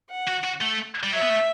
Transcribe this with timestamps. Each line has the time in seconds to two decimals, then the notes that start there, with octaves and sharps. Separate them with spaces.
0.10 F#5
0.28 F#4
0.44 F#4
0.62 A3
1.03 G3
1.12 F#3 E5
1.22 B3
1.30 A3